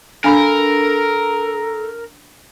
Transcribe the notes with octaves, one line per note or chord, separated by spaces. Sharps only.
D4 A4 A#4 F5 B5